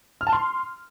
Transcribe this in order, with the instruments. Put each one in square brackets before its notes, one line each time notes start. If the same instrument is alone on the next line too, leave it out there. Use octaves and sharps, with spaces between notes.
[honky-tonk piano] F6
A5
C6